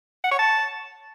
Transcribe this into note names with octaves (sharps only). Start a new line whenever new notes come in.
F#5
C#5
A5